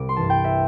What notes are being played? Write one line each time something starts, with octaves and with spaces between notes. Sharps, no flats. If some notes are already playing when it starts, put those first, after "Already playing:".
Already playing: C2 C3 D6
C6
G2 E3 A5
G5
E5